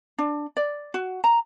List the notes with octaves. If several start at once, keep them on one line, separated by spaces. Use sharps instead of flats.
D4
D5
F#4
A#5